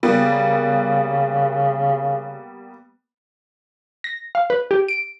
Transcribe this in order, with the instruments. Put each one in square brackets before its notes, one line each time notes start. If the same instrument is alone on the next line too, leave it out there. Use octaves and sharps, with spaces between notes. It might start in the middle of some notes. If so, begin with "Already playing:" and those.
[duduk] C#3 [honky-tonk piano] G3 A#3 B3
[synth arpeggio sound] A#6
F5
B4
G4
D7